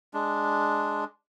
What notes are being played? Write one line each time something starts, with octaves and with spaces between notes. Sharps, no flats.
G#3 D4